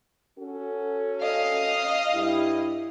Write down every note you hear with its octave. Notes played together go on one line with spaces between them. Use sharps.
C#4 F#4 A4
D#5 F5
G2 G3 E4